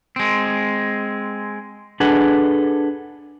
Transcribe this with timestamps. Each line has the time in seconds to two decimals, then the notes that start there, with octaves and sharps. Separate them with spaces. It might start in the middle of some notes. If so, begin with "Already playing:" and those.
0.16 G#3 C4
2.00 D4 G#4 A4 B4 F#5